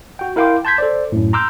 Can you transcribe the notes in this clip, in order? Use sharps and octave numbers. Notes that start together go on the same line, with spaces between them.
F#4 G5
E4 A#4 F5 G5 C6 D6
A5 C6 G6 G#6 B6
A4 C5 D5
F#2 A2
A#5 C6 D6 E6 F6 G6